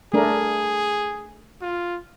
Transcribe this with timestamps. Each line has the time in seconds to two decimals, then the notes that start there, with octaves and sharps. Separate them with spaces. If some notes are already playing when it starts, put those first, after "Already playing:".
0.14 A3 D4 G#4 A#4
1.62 F4